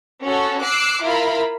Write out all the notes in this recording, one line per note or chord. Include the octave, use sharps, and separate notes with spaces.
C#4 F#4 A4 C#5
D6 E6 F#6 C7 D7
E4 F4 A#4 F5 B5